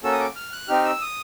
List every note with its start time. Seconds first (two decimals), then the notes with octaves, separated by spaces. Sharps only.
0.03 A#3 C#4 F#4 A4 E6
0.12 D#6
0.20 D6
0.36 F6
0.52 F#6
0.68 C4 D#4 G4 F6
0.85 E6
1.01 D#6